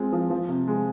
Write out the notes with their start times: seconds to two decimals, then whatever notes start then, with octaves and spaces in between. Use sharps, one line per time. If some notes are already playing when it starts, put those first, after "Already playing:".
Already playing: G#3 C4 F4
0.12 F3
0.30 F3
0.49 C3
0.68 G#3